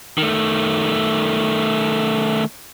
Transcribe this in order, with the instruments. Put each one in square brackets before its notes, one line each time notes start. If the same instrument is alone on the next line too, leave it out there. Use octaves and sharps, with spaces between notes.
[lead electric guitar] D#3 A3